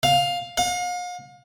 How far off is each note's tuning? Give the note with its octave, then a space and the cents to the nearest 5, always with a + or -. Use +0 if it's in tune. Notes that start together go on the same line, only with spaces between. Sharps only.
F5 +10
F5 +40